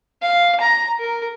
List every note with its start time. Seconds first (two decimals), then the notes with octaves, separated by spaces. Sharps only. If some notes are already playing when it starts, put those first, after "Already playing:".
0.22 F5
0.60 A#5
0.99 A#4